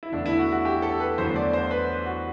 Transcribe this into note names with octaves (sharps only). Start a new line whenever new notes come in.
E4
E2 D3 A3 D4
E4
F#4
F#4
G4
A4
B4
E2 D3 F#3 A3 C5
D5
C5
B4
F#4